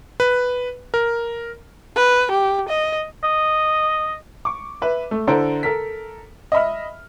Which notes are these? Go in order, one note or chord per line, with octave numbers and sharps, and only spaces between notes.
B4
A#4
B4
G4
D#5
D#5
C#6 D6
B4 E5
A3
D3 E4 A4 C5 A#5 D7
A4 A#4 B6
D#5 E5 B5 F6